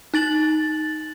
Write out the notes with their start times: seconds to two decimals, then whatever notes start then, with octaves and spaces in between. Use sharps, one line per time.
0.14 D#4 A6 F#7